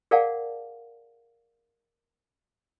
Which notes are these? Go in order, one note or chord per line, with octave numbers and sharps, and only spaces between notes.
G#4 A#4 D5 F5 F#5 A5